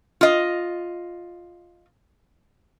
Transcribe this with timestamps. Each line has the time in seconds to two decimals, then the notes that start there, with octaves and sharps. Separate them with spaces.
0.21 F4 D#5